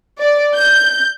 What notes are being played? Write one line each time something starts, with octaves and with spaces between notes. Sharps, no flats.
D5
G6